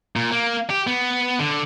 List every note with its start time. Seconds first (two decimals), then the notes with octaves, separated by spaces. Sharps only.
0.16 A#2
0.32 A#3
0.70 G4
0.87 B3
1.39 D3